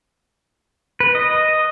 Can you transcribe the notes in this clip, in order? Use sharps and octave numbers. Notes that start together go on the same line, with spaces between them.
B4
D#5